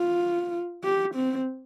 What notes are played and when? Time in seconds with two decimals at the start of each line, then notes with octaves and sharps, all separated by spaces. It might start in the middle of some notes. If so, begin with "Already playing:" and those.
Already playing: F4
0.84 G4
1.15 C4